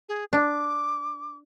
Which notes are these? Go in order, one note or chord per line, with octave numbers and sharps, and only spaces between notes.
G#4
D4 D6